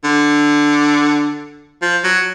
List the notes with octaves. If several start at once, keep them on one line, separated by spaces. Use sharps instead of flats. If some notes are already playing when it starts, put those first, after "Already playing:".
D3
F3
F#3